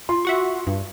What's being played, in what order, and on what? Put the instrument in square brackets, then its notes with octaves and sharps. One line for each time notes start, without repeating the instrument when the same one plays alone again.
[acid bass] F4 [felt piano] C6
[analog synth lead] F#4 [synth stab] E5 F#5 C#6
[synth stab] G2